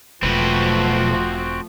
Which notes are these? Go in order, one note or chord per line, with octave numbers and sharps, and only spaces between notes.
E1 B1 F3 A3 C4 F#4 B4